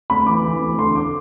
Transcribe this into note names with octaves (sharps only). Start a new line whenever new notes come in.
D2 B5
E3 D6
E3
D2
D3 C6
D6